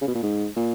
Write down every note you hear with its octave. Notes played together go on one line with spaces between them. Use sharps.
C#3
B2
A#2
G#2
A#2